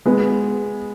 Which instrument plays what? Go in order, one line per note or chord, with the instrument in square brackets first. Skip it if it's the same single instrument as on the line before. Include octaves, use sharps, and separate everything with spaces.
[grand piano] G#3 B3